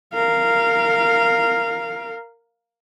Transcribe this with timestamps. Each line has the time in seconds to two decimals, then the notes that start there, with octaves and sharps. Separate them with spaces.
0.14 A#4 F5